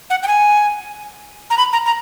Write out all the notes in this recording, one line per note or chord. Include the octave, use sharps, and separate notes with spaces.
F#5
G5
G#5
A#5
B5
A#5
A#5